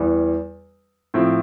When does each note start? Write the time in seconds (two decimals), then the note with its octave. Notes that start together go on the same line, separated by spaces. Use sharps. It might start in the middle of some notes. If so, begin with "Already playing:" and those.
Already playing: E2 E3 G3
1.14 A2 F3 C4